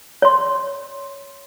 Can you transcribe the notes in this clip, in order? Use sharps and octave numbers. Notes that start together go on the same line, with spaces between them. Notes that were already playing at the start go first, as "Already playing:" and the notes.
C#5 C6